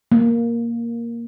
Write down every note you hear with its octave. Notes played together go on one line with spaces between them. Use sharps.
A#3